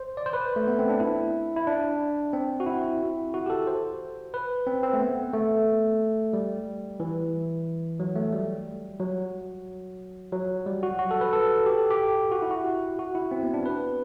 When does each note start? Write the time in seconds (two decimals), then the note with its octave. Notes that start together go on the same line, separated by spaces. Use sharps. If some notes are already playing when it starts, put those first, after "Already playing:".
Already playing: C5
0.17 D5
0.26 C5
0.33 B4
0.56 A3
0.67 B3
0.79 C4
0.89 D4
1.00 E4
1.56 E4
1.67 D4
2.33 C4
2.60 F#4
2.66 E4
3.34 F#4
3.46 G4
3.50 A4
3.67 C5
4.34 B4
4.67 C4
4.83 C4
4.93 A3
5.00 B3
5.33 A3
6.33 G3
7.00 E3
8.00 F#3
8.16 A3
8.32 G3
9.00 F#3
10.33 F#3
10.66 G3
10.83 F#4
10.99 F#4
11.11 A4
11.21 B4
11.33 A4
11.66 G4
11.78 A4
11.91 G4
12.32 F#4
12.42 E4
12.51 F#4
12.99 F#4
13.15 E4
13.31 C4
13.43 B3
13.54 D4
13.65 B4